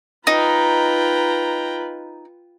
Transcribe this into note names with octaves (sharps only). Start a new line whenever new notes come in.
D#4 F4 B4 G5 A#5